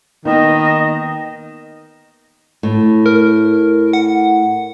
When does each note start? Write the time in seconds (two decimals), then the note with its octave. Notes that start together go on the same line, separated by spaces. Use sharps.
0.25 D#3 A#3 B3 D#4 D#5
2.63 A2
3.06 A#4
3.93 F#5